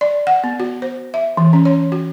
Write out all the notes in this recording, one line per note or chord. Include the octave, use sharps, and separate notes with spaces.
D5
F#5
B3
F#4
C5
E5
E3
C#4
C#5
F#4